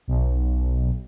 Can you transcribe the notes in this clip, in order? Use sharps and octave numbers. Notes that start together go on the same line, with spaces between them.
B1